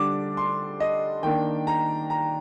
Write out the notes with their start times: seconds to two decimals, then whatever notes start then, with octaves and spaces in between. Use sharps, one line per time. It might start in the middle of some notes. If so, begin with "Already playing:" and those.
Already playing: D3 G3 D4 D6
0.37 C6
0.80 D#5
1.23 D#3 A#3 D4 G5
1.67 A#5
2.10 A#5